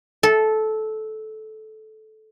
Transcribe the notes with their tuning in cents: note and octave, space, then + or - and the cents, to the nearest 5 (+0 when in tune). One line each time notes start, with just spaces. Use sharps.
A4 -15